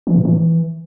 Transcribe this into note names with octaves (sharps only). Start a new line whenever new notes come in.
E3
A2
E3